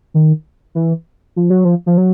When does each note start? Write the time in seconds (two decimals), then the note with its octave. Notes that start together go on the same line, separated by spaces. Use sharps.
0.14 D#3
0.75 E3
1.36 F3
1.50 F#3
1.65 F3
1.86 F3
1.97 F#3